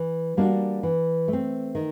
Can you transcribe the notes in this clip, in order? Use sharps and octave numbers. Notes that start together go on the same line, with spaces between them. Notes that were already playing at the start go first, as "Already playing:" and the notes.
Already playing: E3
G3 A#3 D4 F#4
E3
A3
C4
D#3